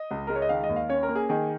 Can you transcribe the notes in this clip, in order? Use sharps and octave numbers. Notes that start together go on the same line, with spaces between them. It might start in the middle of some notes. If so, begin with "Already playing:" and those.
Already playing: D#5
C#2
G#3 A#4
C#5
D#5
D#3 F5
D#5
D#2
F5
C#4 C#5
A#4
A#3
G#4
D#3 G#4